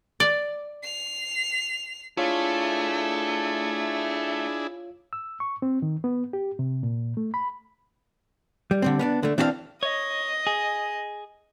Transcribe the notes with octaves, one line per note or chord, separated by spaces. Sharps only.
D5
C7 F7
A3 D4 E4 F4 G#4 C#5 F5
E6
C#6
C4
D#3
B3
G4
C3
A#2
A3
B5
G3
D3 G3 C4
B3 C#4 D4
D3 A3
E3 C4 D4 F4 F5
C#5 D#5
G#4